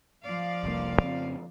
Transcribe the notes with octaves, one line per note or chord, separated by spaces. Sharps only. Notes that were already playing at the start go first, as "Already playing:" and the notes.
F3 D5 F5
F1 C2 A#3
F2 C#3 C4